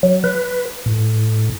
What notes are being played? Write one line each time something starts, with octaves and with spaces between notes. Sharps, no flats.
F#3
B4
A2